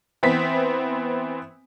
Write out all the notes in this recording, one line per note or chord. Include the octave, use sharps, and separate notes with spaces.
E3 B3 C4 B5 B6